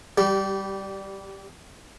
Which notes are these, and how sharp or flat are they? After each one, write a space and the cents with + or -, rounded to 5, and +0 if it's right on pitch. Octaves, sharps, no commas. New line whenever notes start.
G3 +0 G4 -25